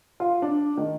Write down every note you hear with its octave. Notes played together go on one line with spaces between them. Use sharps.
F4
D4
D#3